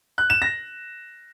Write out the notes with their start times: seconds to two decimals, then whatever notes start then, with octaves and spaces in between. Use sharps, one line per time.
0.18 F#6
0.30 E7
0.42 A#6